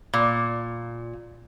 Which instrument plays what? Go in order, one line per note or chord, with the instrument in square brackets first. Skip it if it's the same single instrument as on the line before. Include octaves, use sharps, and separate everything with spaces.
[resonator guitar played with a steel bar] A#2